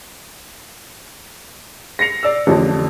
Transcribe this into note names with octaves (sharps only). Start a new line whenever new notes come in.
A#6 C7 C#7 F7
D5 E6
A1 F2 D3